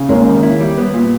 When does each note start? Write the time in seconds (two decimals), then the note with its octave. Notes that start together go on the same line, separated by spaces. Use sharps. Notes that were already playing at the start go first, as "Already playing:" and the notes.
Already playing: C#3
0.09 G#3 A#3 C#4
0.26 D#2
0.43 E4
0.61 G3
0.78 B3
0.94 A#2